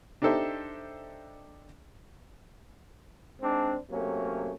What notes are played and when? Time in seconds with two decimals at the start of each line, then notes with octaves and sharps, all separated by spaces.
0.22 D4 D#4 G4 A4 C5 E5
3.42 G#2 C4 D4
3.90 C3 F#3 A3 A#3 C#4